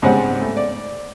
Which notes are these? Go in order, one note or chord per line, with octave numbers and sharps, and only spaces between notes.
C#2 G#2 G3 C4 C#5 F#5
A3
D5